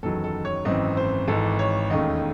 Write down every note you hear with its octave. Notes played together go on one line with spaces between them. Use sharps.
F#1 E2 D#3 F#3 A4
A4
C#5
G#1 F#2 E3 C4 D#5
C5
G#1 G#2 E3 A4
C#5
E1 D#2 D#3 A3 C#4 D#5